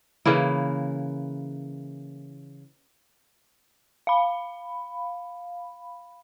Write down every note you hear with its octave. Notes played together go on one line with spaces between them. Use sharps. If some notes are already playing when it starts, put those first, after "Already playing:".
C#3 E3 A#3 E4
F5 B5